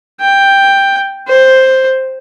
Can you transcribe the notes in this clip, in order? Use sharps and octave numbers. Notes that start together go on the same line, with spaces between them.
G5
C5